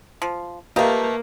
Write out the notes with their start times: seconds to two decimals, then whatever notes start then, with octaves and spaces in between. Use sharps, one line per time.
0.22 F3
0.76 A3 A#3 F4 G4 B4 D#5 F5 A#5